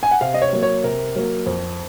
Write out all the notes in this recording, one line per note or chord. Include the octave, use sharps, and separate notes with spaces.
G#5
F#5
C3 F5
D#5
C#5
F#3 A#3
C#5
C3 A#4
F#3 A#3
F2